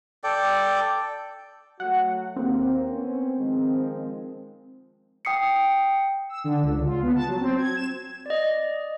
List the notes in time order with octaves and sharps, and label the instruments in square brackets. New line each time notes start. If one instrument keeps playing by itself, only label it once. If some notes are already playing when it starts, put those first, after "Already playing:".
[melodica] A4 D5 G5
[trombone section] F#3 A3 F#4 [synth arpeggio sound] F#5
[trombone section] D#2 A#3 [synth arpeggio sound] C4
[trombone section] B3 C#4
D#3 F3 G#3
[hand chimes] G5 D#6 C7 C#7
[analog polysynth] E6
D3
C#2
F4
B3
A5
F#3
C4
G#6
E7
[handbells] D5 D#5